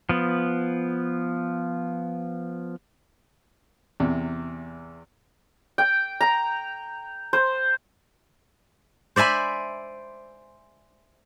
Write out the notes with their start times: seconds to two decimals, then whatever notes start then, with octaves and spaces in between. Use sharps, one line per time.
0.09 F3 B3
4.00 E2 C3
5.78 G5
6.21 A#5
7.33 C5
9.16 C5 D5 E5 G#5 B5